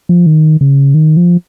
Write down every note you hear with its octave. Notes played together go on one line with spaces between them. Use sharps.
F3
D#3
C#3
D#3
F3